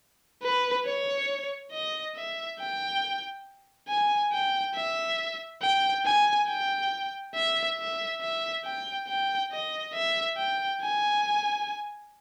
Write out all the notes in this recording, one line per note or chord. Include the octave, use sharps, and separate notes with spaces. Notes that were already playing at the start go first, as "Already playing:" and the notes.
B4
C#5
D#5
E5
G5
G#5
G5
E5
G5
G#5
G5
E5
E5
E5
G5
G5
D#5
E5
G5
G#5